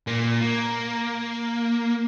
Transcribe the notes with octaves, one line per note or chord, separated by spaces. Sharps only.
A#2 A#3
A#3